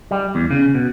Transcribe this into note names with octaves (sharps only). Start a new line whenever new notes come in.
G3
E2
C#3
B2